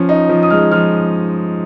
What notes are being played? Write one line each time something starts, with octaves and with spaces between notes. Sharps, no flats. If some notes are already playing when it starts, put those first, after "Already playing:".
Already playing: F3 C#4
D#4
F3
D#6
G#3 F6
F3 F6